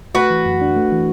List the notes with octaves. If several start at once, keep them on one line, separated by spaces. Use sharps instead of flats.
A3 F#4 B4
E3
F#2
D4
A3
E3